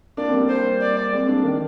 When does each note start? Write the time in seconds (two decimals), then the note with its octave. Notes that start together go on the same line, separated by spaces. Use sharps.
0.17 A#3 D4 D5
0.29 C4
0.33 G3 A#3
0.49 C5
0.81 D5
1.13 G#3 C4
1.29 A#3 D4
1.44 D#3